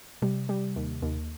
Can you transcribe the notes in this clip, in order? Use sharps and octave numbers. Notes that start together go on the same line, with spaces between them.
C3 G3
G3
D#2
D#2